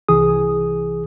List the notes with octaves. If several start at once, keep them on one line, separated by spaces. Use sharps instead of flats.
C2 E3 G#4 D#6